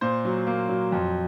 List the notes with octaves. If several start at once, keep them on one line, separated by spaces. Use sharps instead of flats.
A#2 C5
F#3
A#3
F#3
F2